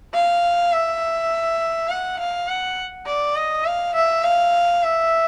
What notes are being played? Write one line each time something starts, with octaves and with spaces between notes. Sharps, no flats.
F5
E5
F#5
F5
F#5
D5
D#5
F5
E5
F5
E5